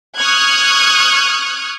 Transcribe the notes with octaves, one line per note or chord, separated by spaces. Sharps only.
C#6 D#6 F6 F#6 G#6